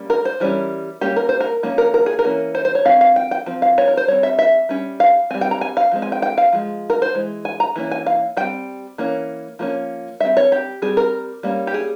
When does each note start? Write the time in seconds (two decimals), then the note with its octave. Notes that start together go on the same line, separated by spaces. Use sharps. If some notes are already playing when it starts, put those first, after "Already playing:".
Already playing: G3 A#3 C#4
0.10 A#4
0.25 C5
0.40 E3 G3 C#4 A#4
1.01 G3 A#3 C#4 G4
1.16 A#4
1.29 C5
1.41 A#4
1.63 F3 A#3 C#4
1.78 A#4
1.94 A#4
2.06 G#4
2.19 A#4
2.24 E3 A#3 C#4
2.55 C5
2.65 C5
2.75 C#5
2.85 F3 C4 F5
3.01 F5
3.16 G5
3.31 G5
3.46 F3 C4
3.62 F5
3.78 C#5
3.88 A#4
3.97 C5
4.08 G3 C4 C#5
4.23 E5
4.39 E5
4.69 G3 C#4
5.00 F5
5.31 G3 C4 G#5
5.41 G5
5.51 A#5
5.61 G#5
5.77 F5
5.92 F3 G#3 C4
6.02 G#5
6.12 G5
6.22 G5
6.38 F5
6.53 F3 G#3
6.90 A#4
7.02 C5
7.14 E3 G#3
7.45 G#5
7.60 A#5
7.76 E3 A#3 C#4
7.91 G#5
8.07 F5
8.37 G3 C4 G5
8.98 E3 A#3 C#4
9.59 F3 A#3 C#4
10.20 G3 C4 E5
10.37 C#5
10.52 G4
10.82 G3 C4 G#4
10.97 A#4
11.43 G3 A#3 C#4
11.67 G4
11.74 G#4